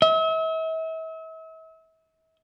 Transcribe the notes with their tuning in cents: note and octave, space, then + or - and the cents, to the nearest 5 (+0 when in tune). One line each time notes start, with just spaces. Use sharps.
E5 -40